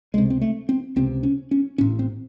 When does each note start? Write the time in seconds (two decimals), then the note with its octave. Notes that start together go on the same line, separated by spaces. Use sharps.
0.14 C#2 G#3
0.18 C3
0.30 C4
0.41 A3
0.69 C4
0.96 C#2 C3 C4
1.23 C#4
1.51 C#4
1.78 A1 A2 C#4
1.99 C4